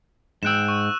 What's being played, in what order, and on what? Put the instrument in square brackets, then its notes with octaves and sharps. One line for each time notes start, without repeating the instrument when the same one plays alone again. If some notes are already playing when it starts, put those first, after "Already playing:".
[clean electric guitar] G#2 G5 [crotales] E6 F#6 E7
[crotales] C#6